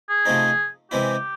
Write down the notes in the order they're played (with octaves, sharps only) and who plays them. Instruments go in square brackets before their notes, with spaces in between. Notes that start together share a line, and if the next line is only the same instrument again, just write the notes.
[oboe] G#4
[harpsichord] C3 F3 A3 C4 D#4
[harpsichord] C3 E3 G#3 C4 E4 [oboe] G4